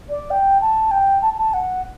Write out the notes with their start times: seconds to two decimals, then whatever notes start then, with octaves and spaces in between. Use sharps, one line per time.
0.10 D5
0.31 G5
0.61 A5
0.91 G5
1.22 A5
1.38 A5
1.54 F#5